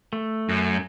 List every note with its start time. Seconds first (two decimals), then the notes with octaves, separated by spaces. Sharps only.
0.13 A3
0.49 F#2